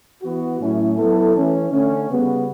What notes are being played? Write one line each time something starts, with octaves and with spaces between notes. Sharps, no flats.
E3 B3 F#4
A2 F#3 A3 C#4 E4
F#3 B3 E4 A4
E3 A3 C#4
D3 A3 C#4
C#3 G3 B3 F#4